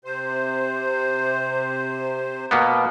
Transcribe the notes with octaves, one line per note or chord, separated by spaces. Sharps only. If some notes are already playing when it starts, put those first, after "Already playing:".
C3 C5
B2 A#3 B3